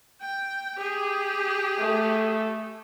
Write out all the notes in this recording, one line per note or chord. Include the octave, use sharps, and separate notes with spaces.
G5
G4 G#4
A3